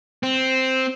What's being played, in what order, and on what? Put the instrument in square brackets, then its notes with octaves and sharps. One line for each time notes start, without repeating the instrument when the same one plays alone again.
[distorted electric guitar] C4